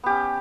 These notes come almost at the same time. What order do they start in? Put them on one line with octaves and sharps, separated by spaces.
B3 G4 C#4